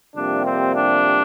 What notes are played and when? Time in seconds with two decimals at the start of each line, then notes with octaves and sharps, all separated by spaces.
0.15 F2 C3 G3 A#3 D4
0.45 C4
0.75 D4